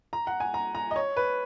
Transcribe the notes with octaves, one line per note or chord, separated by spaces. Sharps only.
A#5
F#5
G#5
A#5
A#5
D#5
C#5
B4